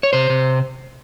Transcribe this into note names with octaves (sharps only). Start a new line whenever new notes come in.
C#5
C3 C5
C3